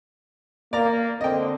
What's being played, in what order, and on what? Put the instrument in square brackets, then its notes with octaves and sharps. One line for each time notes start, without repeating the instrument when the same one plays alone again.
[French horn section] A#3 [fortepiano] D5 A#5
[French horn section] D3 C4 [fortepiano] D#5 G5